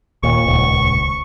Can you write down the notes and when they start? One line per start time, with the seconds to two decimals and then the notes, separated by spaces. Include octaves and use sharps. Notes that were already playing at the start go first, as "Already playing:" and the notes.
0.23 D#2 A#2 C#6
0.46 D#1 C#2